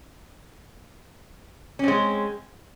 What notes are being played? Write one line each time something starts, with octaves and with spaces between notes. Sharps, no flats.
G#3 C4 C#4